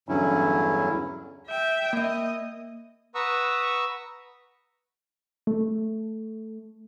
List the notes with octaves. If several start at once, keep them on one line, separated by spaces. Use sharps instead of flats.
E2 G2 D3 F#3 C#4 E4
E5 G5
A#3 D#5 E5
B4 F#5 A#5 C#6 D#6 E6
A3